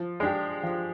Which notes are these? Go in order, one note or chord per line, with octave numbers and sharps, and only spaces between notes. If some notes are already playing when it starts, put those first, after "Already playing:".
Already playing: F3
G#3 D4 G4
F3